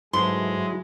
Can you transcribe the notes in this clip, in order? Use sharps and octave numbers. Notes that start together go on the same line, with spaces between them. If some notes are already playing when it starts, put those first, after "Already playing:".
G#2 F#3 G#3 A3 E4 B4 C6